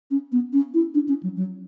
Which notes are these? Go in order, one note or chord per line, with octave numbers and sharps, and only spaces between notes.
C#4
B3
C#4
E4
D4
C#4
F#3
F#3